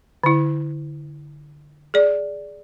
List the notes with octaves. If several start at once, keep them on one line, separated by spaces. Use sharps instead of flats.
D3 E4
G#4 D5